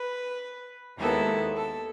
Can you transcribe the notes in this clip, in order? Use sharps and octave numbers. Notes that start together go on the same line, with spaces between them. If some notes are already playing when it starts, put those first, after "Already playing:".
Already playing: B4
D#2 D#3 G#3 B3 E4 A4
A4